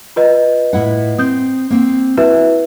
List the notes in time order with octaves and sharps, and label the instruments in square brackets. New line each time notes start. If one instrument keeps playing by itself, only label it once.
[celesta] F4 B4 D#5
[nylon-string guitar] A2 E4 F#5
[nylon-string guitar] C4 [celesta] D#6 G6
[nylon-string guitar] A#3 C4
[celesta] E4 B4 E5 [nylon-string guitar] F#4